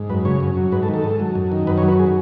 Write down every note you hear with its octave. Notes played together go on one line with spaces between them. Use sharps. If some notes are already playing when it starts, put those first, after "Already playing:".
Already playing: G#2
F#2 B4
C#3 C#5
F#2
F#3
G#2 B4
A4
D#3
A4
G#2
F#3
F#2
D#3
F#2 B4
C#5
F#3
B4
G#4